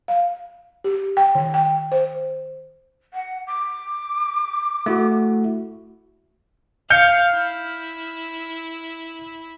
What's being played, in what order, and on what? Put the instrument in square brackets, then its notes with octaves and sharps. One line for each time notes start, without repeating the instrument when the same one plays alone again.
[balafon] F5
G4
G5
D#3
G5
C5
[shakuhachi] F#5
D6
[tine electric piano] A3 E4 F#4
[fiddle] F5 [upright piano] F6 G6 C#7
[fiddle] E4